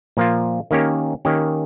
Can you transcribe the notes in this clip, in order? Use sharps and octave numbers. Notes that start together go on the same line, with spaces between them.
A#2 F3 A#3 F4
D#3 A#3 C#4 G4 C#5
D#3 A#3 C#4 G4 C#5